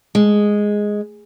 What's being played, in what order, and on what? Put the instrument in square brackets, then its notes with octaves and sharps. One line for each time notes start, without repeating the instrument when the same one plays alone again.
[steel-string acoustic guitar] G#3